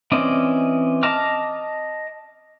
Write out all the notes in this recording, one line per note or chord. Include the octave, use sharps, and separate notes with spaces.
E3 C4 C#4 D5 D#5
D#5 A5 A#5 D6 F6